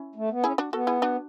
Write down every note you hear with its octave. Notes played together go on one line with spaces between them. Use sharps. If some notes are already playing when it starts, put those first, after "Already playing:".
Already playing: C#4 E4
A3
B3
C#4 E4 G#4
D4 F#4
B3 F#4 A4
E4 G#4
D4 F#4